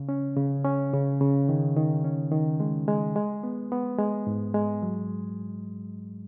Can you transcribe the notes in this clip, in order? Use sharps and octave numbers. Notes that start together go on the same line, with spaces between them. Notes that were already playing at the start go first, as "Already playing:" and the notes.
Already playing: C#3
C#4
C#3
C#4
C#3
C#3
D#3
D#3
C#4
D#3
G#3
G#3
G#3
B3
B3
G#3
G#2
G#3
F#3